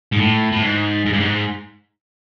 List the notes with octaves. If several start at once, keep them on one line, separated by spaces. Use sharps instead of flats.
G#2
A2
A2
G#2
G#2
G2
G#2